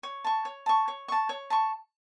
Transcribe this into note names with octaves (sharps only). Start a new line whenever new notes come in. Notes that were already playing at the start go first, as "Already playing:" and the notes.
C#5
A5 C#6
C#5
A5 C#6
C#5
A5 C#6
C#5
A5 C#6